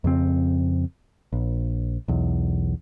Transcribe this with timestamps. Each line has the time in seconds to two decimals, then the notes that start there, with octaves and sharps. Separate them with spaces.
0.04 F2 C#3 C4
1.33 A#1
2.08 B1 E2